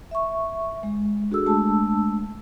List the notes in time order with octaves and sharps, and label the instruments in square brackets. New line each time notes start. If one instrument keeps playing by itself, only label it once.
[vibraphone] E5 C#6
G#3
D4 F#4 G#4 A4 E6
G#3 A3 D4 A5 E6